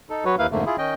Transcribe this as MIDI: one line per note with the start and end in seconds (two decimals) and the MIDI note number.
0.10 0.25 63
0.10 0.25 69
0.25 0.36 54
0.25 0.36 66
0.25 0.36 71
0.25 0.36 73
0.39 0.47 39
0.39 0.47 58
0.39 0.47 64
0.39 0.47 71
0.39 0.47 77
0.51 0.65 41
0.51 0.65 44
0.51 0.65 50
0.51 0.65 57
0.51 0.65 58
0.66 0.76 64
0.66 0.76 65
0.66 0.76 68
0.78 0.94 51
0.78 0.94 61
0.78 0.94 75
0.78 0.94 79